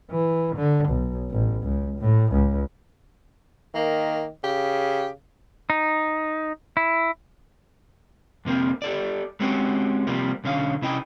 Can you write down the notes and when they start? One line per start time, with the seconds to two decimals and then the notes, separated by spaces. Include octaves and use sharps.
0.10 E3
0.56 D3
0.89 B1
1.31 A1
1.63 C#2
1.99 A2
2.32 C#2
3.75 D#3 A#3
4.44 C#3 G4
5.70 D#4
6.77 E4
8.45 F2 C3 A#3 C4
8.82 G4 A4 D5
9.40 G#3 C4 C#4 F#4 G4
10.07 C3 F3 G3 A#3 C4
10.44 B1 D3 C#4 F5
10.82 C3 C#4 E4 D#5 G5